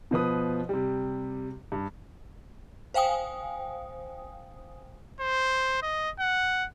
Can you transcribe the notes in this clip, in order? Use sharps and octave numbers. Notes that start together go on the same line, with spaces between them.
B2 F3 B4 D#6
C3 G3
G2
C5 F5 G5 G#5 D#6
C5
D#5
F#5